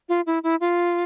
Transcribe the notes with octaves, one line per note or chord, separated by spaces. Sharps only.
F4
E4
E4
F4